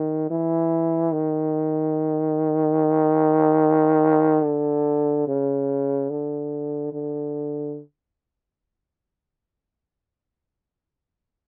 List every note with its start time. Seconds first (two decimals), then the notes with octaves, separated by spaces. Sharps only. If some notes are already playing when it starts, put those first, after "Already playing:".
Already playing: D#3
0.30 E3
1.12 D#3
4.44 D3
5.27 C#3
6.10 D3
6.93 D3